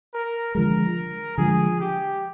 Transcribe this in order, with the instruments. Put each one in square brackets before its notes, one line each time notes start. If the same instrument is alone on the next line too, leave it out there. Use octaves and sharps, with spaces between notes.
[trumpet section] A#4
[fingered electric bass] D3 F3 G#3 [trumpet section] A#4
[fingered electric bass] D3 F3 G#3 [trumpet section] G#4
[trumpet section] G4